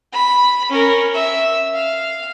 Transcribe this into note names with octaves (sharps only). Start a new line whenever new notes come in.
B5
C#4 A#4
E5
F5